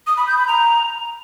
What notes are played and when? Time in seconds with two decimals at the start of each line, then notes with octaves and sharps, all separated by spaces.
0.07 D#6
0.17 B5
0.27 G6
0.37 B5
0.48 A#5